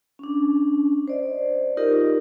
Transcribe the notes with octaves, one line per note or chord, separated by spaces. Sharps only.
C#4 D4
C5 D5 D#5
D#4 F4 G4 A#4 D#5